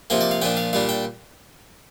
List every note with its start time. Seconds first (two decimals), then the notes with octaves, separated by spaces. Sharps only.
0.10 C3 F3 A#3 G5
0.21 D5
0.31 F5
0.42 A#2 F3 D4 G5
0.57 F5
0.73 A#2 G3 D4 F5
0.89 G5